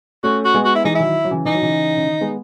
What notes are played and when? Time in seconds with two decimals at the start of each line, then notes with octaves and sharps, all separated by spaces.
0.23 A3 C#4 F#4
0.45 F#4
0.54 G#3 B3
0.65 F#4
0.75 E4
0.84 E3 G#3 D#4
0.95 D#3 F#3 E4
1.24 F#3
1.30 C#3 E3
1.45 E3 D#4
1.54 F#3
1.62 C#3 E3
1.97 C#3
2.06 D#3
2.21 G#3 B3